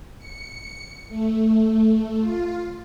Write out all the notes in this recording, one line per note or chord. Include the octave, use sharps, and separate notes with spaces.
C#7
A3
F4